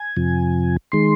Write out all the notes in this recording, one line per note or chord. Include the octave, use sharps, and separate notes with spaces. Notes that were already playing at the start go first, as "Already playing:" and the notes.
Already playing: G#5
F2 C3 F3
D#3 G#3 C6